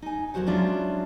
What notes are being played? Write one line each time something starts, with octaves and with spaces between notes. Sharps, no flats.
D#4 G#5
D#2 A#2 F#3 F#4 C5 F#5
F#3 G#3 C#4 D4 E4 F4